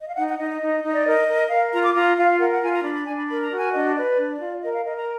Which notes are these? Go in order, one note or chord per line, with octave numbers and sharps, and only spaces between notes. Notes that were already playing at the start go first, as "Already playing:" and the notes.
D#5
F5
D#4 F#5
F#5
D#4 D#5
D#5
D#4
D#4
D5
A#4 D#5
A#4
A#4 F5
F4 A#5
D6
F4 A#5
F4 F5
A#4 F#5
F#5
F4 G#5
A#5
D4 B5
B5
D4 G#5
B5
A#4 B5
A#5
F#4
G#5
D4 D#5
B4 D5
D4
F4
A#4 D#5
F5
A#4 D#5
A#5